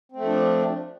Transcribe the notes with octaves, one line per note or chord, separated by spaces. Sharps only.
F3 A3 C4 D4